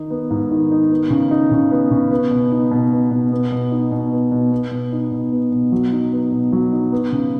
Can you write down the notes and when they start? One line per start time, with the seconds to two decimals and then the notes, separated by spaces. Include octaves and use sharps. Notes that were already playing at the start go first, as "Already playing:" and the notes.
Already playing: D#3 D#4
0.10 B3
0.30 G#2
0.51 D#3
0.71 D#4
0.91 B3
1.10 C#3
1.31 D#4
1.51 C#3
1.71 B3
1.91 C#3
2.11 B3
2.31 B2
2.51 D#4
2.71 B2
2.92 B3
3.11 B2
3.32 B3
3.52 B2
3.71 D#4
3.92 B2
4.12 B3
4.32 B2
4.51 B3
4.72 B2
4.92 D#4
5.12 B2
5.32 B3
5.52 B2
5.72 F#3
5.92 D#4
6.12 B3
6.32 B2
6.52 F#3
6.72 D#4
6.92 B3
7.12 C#3